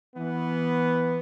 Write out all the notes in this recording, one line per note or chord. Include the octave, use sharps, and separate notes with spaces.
E3 B3